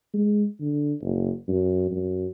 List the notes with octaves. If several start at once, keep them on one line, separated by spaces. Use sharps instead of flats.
G#3
D3
F#1
F#2
F#2